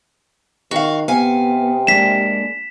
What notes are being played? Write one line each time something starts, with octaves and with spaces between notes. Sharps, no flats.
D#3 F#4 F5
C3 B3 F5 G#5
G#3 A#3 D4 B6 E7